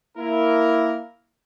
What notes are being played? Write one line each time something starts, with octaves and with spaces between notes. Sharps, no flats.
A#3 E4 A#4